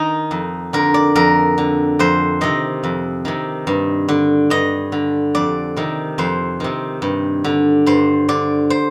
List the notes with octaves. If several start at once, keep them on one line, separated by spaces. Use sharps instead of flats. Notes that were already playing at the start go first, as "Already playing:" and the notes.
Already playing: D#3 D#4
F2
D3 A#4
D5
F2 A#4
D3
F2 C5
C3 D#3 D#5
F2
C3 D#3
G2
D3
G2 D#5
D3
F2 D5
C3 D#3
F2 C5
C3 D#3
G2
D3
G2 C5
D3 D5
C5